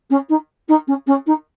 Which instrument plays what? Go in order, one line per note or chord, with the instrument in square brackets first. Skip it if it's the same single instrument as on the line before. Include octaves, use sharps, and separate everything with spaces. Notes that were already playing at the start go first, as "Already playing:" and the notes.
[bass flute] C#4
D#4
D#4
C#4
C#4
D#4